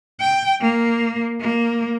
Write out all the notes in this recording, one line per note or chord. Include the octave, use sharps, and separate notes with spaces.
G5
A#3
A#3